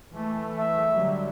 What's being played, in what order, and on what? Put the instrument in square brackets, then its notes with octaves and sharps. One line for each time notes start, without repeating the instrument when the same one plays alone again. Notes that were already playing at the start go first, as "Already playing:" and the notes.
[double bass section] E3 A3
[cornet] E5
[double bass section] D3 F#3 G3